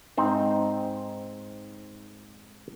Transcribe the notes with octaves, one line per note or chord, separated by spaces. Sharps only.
G#2 C4 D#4 C5